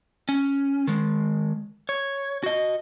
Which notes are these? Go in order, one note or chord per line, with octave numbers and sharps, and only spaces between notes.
C#4
D#3 G#3
C#5
F#4 D#5